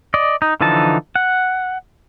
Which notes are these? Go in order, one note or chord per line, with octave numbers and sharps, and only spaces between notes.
D5 D#5
D#4
D3 E3 F3 D#4 A5
F#5